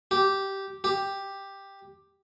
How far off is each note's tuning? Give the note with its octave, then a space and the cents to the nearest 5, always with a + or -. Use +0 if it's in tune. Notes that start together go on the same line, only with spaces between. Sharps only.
G4 -10
G4 +5